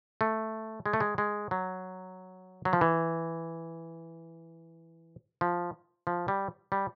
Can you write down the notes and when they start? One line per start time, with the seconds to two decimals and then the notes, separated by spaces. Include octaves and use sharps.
0.21 A3
0.86 G#3
0.93 A3
1.00 G#3
1.18 G#3
1.51 F#3
2.65 F#3
2.73 F3
2.81 E3
5.41 F3
6.07 F3
6.28 G3
6.72 G3